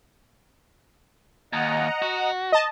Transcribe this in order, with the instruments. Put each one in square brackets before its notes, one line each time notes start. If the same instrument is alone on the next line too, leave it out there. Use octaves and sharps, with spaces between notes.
[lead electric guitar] D#2 [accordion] D#5 F#5 A#5
[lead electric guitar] F#4
[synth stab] D#5 A5